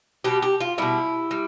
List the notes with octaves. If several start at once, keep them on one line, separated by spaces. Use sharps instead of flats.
B2 G3 G4
G4
F4
B2 G3 E4
G3